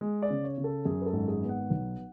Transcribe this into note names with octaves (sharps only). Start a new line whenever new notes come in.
G#3
D5
C#3
C#5
C#3
A4
F#2 G#4
B4
A4
G#1
G#4
B3
F#5
B1